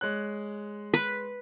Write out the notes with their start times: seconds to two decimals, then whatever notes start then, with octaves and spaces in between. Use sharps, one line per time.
0.01 G#3 C#5 F#6
0.94 B4